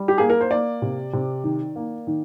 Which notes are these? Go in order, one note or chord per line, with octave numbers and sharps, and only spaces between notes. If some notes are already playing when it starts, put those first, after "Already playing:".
Already playing: G3
G4
A#3 G#4
A#4
C5
A#3 D5
C3
C3
D#3
A#3
D#3